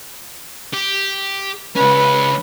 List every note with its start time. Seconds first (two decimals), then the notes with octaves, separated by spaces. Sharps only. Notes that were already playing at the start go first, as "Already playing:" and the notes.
0.74 G4
1.76 C#2 C#4 B4